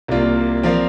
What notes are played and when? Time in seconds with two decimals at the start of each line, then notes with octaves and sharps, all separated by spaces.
0.08 C2 C3 A#3 F4 D5
0.63 F3 C4 A#4 D5 F5